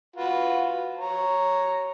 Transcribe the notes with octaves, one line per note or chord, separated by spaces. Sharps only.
F4 F#4 B4
C#5 A#5